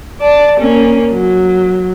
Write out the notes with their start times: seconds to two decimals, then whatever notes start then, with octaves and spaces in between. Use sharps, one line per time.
0.20 D5 A5
0.60 A#3 C#4
1.12 F#3